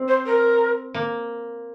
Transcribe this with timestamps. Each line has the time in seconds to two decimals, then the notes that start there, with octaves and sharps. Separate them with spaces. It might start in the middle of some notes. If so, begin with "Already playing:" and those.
Already playing: C4
0.08 C5
0.26 A#4
0.94 A#3